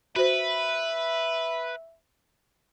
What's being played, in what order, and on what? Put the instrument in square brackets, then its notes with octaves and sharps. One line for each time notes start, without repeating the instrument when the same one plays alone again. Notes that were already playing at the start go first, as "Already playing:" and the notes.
[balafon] F#4 C5 [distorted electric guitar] B4 [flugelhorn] E5